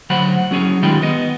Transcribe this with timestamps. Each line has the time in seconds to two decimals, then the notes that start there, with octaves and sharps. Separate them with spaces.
0.10 D2 F#3 C5 F#5 B5
0.51 F#3 C#4 G#4 C#5
0.82 D#3 G3 G#3 F4 G5 B5
1.02 B3 D#5